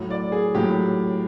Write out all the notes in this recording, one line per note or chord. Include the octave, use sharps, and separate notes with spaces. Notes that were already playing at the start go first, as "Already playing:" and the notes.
Already playing: A2 F#3
D5
G#4
A2 F#3 G4